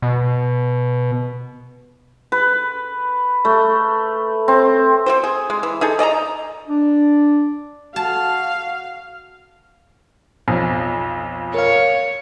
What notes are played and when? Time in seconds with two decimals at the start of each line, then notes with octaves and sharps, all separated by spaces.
0.02 B2
2.32 B4
3.45 A3
4.48 C4
5.06 C4 F#4 C5
5.24 G#4
5.50 G#3
5.63 E3
5.81 D#4 G#4 A4
5.99 D5 D#5 A5 A#5
6.68 D4
7.96 F#4 F5 A5
10.47 B1 F2 F3
11.54 A#4 C#5 F5